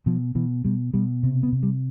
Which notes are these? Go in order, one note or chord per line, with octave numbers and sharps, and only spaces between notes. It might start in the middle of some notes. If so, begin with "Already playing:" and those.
B2 F3
B2 E3
B2 G3
B2 G3
C3 C4
B3
C3
G3